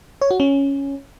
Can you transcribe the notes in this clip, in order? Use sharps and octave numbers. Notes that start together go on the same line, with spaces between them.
C#5
F#4
C#4